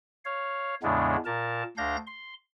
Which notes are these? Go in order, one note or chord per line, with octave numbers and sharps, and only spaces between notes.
C#5 F5
E2 A2 C#3 G#3 B3 D4
A#2 A#4 A5
D2 D4 F5 G6 A#6
C6